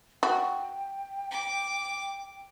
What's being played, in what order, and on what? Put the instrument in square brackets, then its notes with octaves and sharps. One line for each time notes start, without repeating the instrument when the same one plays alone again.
[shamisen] F#4 [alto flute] G5
[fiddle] D6